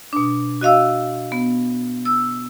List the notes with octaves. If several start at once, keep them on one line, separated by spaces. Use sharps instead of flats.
B2 D4
F#4 D#5 F5 E6
B3
E6